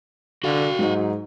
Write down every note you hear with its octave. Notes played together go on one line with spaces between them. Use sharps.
D3 F#4 F5
G#2 F#3 D#4